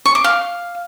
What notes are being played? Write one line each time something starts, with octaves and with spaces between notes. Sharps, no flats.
C#6
D6
F5